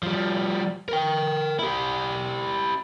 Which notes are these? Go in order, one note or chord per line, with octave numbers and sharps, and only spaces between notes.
F3 G3
A#4 G5
E4 G4